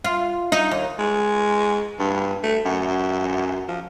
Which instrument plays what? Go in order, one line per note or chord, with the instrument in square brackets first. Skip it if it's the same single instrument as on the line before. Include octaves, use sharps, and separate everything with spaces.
[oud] F4
D#4
D#2
[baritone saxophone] G#3
G2
A3
F#2
F3